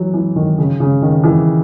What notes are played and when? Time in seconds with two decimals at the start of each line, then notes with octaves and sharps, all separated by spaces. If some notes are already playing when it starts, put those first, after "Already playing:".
Already playing: E3 F#3
0.14 E3
0.36 D#3
0.58 C#3
0.80 C#3
1.02 D#3
1.24 E3